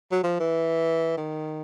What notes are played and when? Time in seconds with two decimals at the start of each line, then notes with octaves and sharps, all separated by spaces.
0.12 F#3
0.24 F3
0.40 E3
1.17 D#3